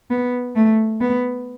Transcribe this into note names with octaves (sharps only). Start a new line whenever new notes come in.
B3
A3
B3